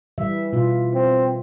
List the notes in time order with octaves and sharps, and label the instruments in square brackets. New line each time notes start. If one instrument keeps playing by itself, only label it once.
[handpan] E3 G3 E5
B2 F4
[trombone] C4